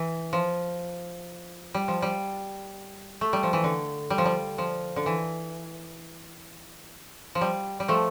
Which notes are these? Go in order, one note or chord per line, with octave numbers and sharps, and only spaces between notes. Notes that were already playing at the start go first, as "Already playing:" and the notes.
Already playing: E3
F3
G3
F3
G3
A3
G3
F3
E3
D3
G3
F3
G3
F3
D3
E3
F3
G3
G3
F3 A3